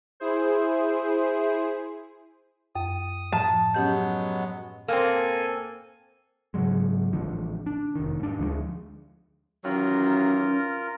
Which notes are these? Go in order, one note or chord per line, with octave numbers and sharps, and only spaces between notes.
E4 G#4 C5
F#2 D#6
A2 F3 A5
F#3 G#3 B3 C#4 G4 G6
A#3 C4 A4 G#5
G#2 C#3 F#3 G#3
A1 D3 F3
D4
F1 D#3
G#2 D4
D2 F3 F#3 G#3
D#3 E3 F#3 C#4 F4 A#4